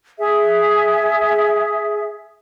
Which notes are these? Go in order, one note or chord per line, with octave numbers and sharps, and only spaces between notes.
G#4 E5